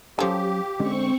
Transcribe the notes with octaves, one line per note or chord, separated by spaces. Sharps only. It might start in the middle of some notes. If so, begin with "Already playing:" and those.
F3 F#3 C#4 G4 A4 G#5
D3 G#3 C4 C#4 C#6